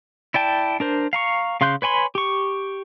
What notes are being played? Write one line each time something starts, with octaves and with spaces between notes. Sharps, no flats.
E4 D5 G5 A5
D4 A#4 C5
F5 A#5 C#6
C#3 F5 C6 F#6 G6
B4 C#5 G#5 B5 C6
G4 C#6